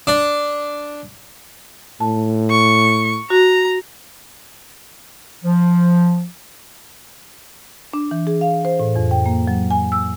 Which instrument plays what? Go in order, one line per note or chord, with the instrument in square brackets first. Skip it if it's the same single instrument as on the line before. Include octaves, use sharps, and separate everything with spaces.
[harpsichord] D4
[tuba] A2 [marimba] A5
[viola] C#6
[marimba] F#4 [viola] A#5
[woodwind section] F3
[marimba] D4
E3
G#4
F5
C5
A2
F2
G5
A#3
F#3
G#5
E6